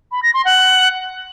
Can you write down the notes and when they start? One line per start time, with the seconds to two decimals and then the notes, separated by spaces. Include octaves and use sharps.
0.12 B5
0.23 A#6
0.34 C6
0.45 F#5